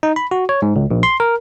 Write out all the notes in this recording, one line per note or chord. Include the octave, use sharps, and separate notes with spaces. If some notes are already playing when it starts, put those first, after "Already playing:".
D#4
B5
F#4
C#5
G#2
C#2
A#1
C6
A#4